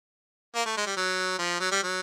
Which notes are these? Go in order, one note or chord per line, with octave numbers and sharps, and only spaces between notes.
A#3
A3
G#3
G3
F#3
F3
F#3
G3
F#3